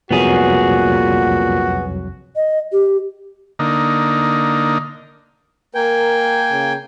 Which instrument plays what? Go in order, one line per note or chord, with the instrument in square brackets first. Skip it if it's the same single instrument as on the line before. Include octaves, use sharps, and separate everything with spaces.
[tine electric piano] C2 F2 F#3 [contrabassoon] A#2 [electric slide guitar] B3 G#4 [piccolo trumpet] F#4
[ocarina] D#5
G4
[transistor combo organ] D3 A#3 D#4
[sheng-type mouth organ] A#3 G5 G#5 [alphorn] A#4
[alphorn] C#3